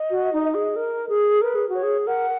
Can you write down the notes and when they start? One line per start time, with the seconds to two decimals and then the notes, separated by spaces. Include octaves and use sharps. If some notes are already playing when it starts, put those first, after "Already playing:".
Already playing: D#5
0.11 F#4
0.33 D#4
0.55 G#4
0.76 A#4
1.09 G#4
1.41 A#4 B4
1.55 G#4
1.69 F#4
1.74 C#5
1.83 G#4
2.07 A#4 F#5